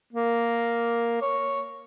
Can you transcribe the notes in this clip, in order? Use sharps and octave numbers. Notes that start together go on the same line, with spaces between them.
A#3
C#5